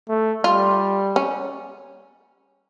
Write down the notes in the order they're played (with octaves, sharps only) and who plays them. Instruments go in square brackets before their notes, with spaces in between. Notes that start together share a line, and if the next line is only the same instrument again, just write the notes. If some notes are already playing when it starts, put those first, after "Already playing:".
[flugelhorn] A3
[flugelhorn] G3 [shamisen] F4
[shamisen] C#4